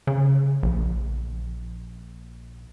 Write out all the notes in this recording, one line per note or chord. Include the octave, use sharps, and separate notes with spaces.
C#3
A#1